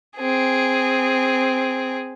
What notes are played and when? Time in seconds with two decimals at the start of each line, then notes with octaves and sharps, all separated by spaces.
0.18 C4 G#4